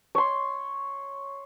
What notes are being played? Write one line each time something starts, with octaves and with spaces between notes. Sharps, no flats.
C#5 C6